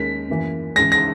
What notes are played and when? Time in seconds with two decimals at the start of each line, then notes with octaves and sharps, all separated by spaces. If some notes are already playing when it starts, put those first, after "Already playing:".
Already playing: D#2 D#3 G#3 C#4 B6
0.28 F#2 E3 A#3
0.76 C#2 C#3 E3 G#3 A#6
0.92 A#6